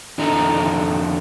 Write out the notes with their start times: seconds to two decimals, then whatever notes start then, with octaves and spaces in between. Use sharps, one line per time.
0.18 F2 D3 D4 D#4 A#5